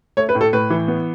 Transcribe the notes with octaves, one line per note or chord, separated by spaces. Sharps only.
A3 C#5
B4
A2
A4
A2 B4
E3
B3